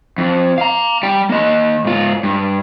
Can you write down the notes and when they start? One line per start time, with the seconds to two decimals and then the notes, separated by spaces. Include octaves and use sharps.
0.18 F2
0.58 F5 A#5
1.03 G3 G5
1.29 A#3 D#5
1.85 G#2 F4
2.23 G2